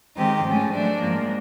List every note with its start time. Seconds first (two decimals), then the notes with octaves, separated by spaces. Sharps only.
0.17 D#3 G#3 C4 D#4 G4
0.46 G#2 F3 A3 C#4
0.74 F#3 A3 D4
1.02 G#2 F3 A#3